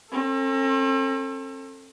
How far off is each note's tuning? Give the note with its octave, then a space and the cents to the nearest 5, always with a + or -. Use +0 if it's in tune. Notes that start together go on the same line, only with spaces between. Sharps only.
C4 +45 A4 +20